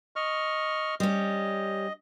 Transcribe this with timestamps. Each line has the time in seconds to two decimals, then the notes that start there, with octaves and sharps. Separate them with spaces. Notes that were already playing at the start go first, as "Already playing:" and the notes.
0.16 D#5 C#6 F6
1.00 G3 C#4 D#5